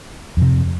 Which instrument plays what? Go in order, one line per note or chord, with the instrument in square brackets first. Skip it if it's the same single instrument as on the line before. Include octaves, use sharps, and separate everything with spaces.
[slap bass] F2 C3